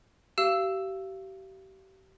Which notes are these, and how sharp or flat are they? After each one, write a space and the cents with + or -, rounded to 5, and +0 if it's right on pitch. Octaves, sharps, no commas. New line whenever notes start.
G4 -35 F5 -30 E6 +0